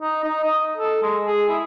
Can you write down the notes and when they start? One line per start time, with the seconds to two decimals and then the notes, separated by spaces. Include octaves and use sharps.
0.02 D#4
0.24 D#4
0.44 D#5
0.77 A4
1.02 G#3
1.26 G#4
1.49 E4